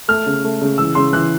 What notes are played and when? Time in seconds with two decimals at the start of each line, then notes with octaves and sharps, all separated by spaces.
0.08 A3 F6
0.26 C#3
0.44 A3
0.62 C#3
0.78 E3 E6
0.95 C#3 C6
1.13 E3 F#6